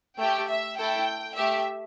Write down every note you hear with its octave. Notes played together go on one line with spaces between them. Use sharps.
A3 G4 G5
E5
A3 E4 A4 G5
A3 G4 E5